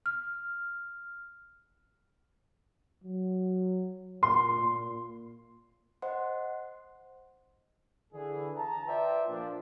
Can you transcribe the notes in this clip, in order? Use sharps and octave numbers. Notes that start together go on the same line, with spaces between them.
F6
F#3
A#2 C6
A#2
C5 D#5 F#5 C6
D3 E3 G#4
A5 A#5
F4 B4 C5 D5 E5 G5
A#2 F3 D4